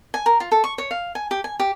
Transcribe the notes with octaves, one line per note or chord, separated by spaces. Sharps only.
G#5
A#4
F4
A4
C#6
C#5
F5
G#5
G4
G#5
G4